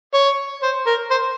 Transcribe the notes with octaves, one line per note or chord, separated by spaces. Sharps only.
C#5
C5
A#4
C5